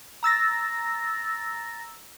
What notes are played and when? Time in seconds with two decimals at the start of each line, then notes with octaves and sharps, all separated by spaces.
0.23 A#5 E6 A6 A#6